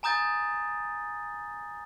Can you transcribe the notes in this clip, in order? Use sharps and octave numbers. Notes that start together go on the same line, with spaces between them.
G#5 A#5 D#6 G6 A6